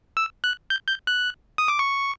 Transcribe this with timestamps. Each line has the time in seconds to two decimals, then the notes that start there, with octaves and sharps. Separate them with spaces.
0.17 E6
0.44 F#6
0.70 G6
0.88 G6
1.07 F#6
1.58 D#6
1.68 D6
1.79 C#6